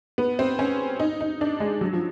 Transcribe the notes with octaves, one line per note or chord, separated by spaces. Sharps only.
B3
C4
C#4
D#4
D#4
D4
G#3
F#3
F3